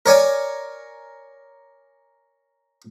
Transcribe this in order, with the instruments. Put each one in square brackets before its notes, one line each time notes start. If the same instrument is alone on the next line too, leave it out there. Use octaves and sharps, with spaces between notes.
[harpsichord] A#4 C#5 D5 G#5